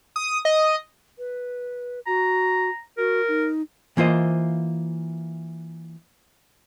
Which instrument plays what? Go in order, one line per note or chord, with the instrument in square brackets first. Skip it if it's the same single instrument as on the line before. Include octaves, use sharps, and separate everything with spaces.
[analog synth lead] D#6
D#5
[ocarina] B4
[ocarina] F#4 [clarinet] A#5
[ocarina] F#4 [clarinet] A#4
[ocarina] D#4
[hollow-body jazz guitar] E3 A#3 F4 C5 D#5